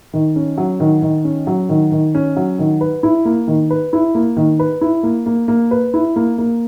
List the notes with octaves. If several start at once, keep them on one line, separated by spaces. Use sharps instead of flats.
D#3
C#4
F#3
D#3
D#3
C#4
F#3
D#3
D#3
C#4
F#3
D#3
B4
E4
A#3
D#3
B4
E4
A#3
D#3
B4
E4
A#3
A#3
A#3
B4
E4
A#3
A#3